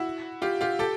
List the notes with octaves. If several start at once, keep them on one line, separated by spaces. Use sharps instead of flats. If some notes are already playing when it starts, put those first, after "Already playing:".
Already playing: E4 F#4
F4 G4
F4 G4
G4 A4